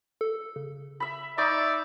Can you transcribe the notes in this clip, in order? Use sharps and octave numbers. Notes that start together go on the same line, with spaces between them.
A4
C#3
E5 B5
D#4 D5 E5 A#5 C#6